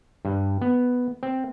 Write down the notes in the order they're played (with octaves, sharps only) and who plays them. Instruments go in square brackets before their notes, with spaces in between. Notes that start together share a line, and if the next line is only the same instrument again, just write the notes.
[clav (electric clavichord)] G2
B3
C4